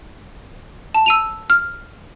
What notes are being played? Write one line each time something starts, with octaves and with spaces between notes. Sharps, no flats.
A5
E6 D#7 F7
F6